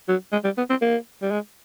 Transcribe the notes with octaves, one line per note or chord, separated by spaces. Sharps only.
F#3
G#3
G3
B3
C4
A#3
G3
G#3